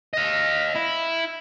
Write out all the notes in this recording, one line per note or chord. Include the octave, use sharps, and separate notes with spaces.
D#5 F5
E4